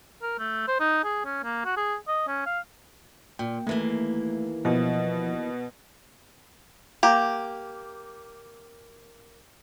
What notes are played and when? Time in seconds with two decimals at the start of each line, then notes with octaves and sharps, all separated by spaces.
0.22 A#4
0.39 A3
0.68 C5
0.80 D#4
1.04 G#4
1.25 C#4
1.43 A#3
1.65 F#4
1.77 G#4
2.08 D#5
2.28 C#4
2.46 F5
3.39 A#2 G5
3.67 D#2 E3 A3 A#3
4.65 B2 F3 E4
7.03 A#3 G4